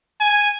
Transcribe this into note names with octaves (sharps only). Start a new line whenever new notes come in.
G#5